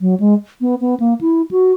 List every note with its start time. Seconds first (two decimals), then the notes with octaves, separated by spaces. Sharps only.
0.01 F#3
0.20 G#3
0.61 B3
0.81 B3
1.00 A#3
1.21 E4
1.51 F#4